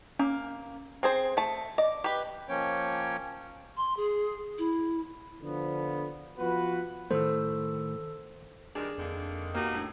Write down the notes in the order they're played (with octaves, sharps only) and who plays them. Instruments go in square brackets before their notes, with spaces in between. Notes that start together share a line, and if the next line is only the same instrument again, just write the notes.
[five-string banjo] A#3 [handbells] C#4
[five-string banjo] C4 G#4 C5
A3 A5
[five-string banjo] D5 [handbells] D#5
[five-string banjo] G4 B4
[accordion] F3 A#3 C#4 C#5 G5
[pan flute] C6
G#4
E4
[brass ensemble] D3 F3 B3
F3 B3 F4 F#4 B4
[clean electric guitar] A2 [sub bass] D#3 [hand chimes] A4 E6 [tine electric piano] C5
[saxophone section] G2 D#3 A#4 [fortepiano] D4 G#4
[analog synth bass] F2 [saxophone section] D3 D#3 A#3
[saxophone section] B2 D#4 F#4 [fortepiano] A#3 G4
[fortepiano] A2 [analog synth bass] D4